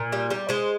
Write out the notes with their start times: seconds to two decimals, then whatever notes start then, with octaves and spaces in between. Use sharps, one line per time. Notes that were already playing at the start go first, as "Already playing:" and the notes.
Already playing: A#2
0.12 G3
0.30 G3
0.49 G#3 C5